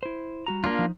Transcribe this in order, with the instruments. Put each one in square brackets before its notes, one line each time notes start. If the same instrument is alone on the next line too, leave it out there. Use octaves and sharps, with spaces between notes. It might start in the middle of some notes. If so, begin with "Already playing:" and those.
[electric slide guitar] E4 C5
G3 F#4 A#5
[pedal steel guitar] A#3 D4 F4
[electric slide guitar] F3 D#4